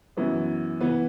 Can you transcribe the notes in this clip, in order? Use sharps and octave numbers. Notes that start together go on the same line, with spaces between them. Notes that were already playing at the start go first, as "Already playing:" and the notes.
F#2 E3 B3
E3 B3